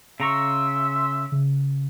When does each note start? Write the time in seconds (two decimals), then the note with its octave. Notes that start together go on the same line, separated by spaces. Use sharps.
0.20 C#3 E5 A#5 C6 C#6
1.32 C#3